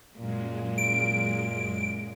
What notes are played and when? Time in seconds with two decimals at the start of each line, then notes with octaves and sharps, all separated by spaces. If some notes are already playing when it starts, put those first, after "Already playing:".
0.19 F#2 A#2 G#3
0.78 D7